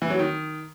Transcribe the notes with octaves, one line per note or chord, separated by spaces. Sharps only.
E3
F#3
D#3